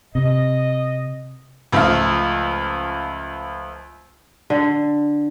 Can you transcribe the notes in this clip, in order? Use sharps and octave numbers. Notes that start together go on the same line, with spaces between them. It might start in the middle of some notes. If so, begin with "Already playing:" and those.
C3 D#5
C#2 F3 A3 F4 F5
D3